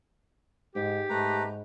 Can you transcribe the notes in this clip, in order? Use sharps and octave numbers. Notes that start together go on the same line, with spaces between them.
G#2 G4
G#2 A3 B4 A#5